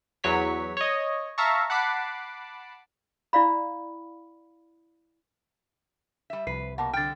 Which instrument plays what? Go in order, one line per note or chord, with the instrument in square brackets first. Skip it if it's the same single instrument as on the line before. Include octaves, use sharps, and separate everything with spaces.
[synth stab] E2 F#3 C#5 B6
C#5 D#5
E5 F5 A5 A#5 C#6
F#5 A5 B5 D6 C7
[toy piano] E4 D5 F5 B5
[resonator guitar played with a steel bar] G3 E5
[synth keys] C2 C3 F3 [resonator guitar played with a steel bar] B4 [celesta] C7
[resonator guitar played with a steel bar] B2 A#3 [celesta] F#5 A5
[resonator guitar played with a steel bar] D3 G5 [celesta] F6 A6